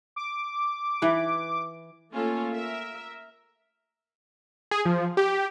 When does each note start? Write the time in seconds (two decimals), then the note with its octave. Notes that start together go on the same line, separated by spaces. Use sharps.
0.16 D6
1.02 E3 B4
2.12 A3 A#3 C#4 F4 A4
2.53 A#4 E5
4.71 G#4
4.85 F3
5.17 G4